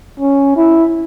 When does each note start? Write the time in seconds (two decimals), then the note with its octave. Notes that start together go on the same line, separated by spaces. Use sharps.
0.20 C#4
0.56 E4